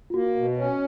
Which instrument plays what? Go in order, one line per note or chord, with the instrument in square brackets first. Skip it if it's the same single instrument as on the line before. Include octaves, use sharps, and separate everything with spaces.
[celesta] F4
[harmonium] A#3 [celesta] F#4
[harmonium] B2
C#4